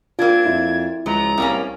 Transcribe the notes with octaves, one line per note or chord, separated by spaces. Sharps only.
A#3 C4 D4 F4 G#6
F2 E4
C#2 F3 F#3 A#5
C2 A2 A#3 C#4